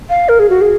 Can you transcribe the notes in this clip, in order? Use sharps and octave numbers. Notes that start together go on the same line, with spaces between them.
F5
A#4
G#4
F#4
G#4